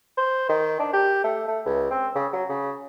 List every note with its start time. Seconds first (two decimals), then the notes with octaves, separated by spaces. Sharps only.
0.17 C5
0.49 D#3
0.80 D4
0.93 G4
1.24 A3
1.48 A3
1.65 C#2
1.91 C4
2.15 C#3
2.33 F#3
2.49 C#3